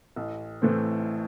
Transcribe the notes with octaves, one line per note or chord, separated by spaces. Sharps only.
A1
A2 E3 A3 C4